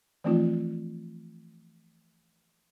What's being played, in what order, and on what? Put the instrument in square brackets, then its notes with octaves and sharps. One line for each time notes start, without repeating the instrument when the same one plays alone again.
[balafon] E3 F3 A3 C4 D#4 F4